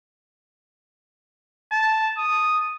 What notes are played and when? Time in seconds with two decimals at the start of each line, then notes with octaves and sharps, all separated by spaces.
1.72 A5
2.18 D#6